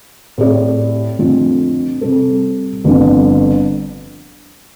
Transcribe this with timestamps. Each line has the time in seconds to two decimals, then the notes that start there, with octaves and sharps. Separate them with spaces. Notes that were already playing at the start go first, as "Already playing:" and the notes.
0.38 A2 A3 C4 G4 D5
1.19 F2 D3 A3 F4
2.01 C3 G3 C4 A4
2.84 G1 F2 D3